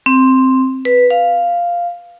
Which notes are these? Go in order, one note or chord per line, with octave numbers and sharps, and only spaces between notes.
C4
B4
F5